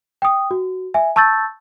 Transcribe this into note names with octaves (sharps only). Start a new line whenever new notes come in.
G5 D#6
F#4
E5 G#5
A5 C#6 E6 G6 A6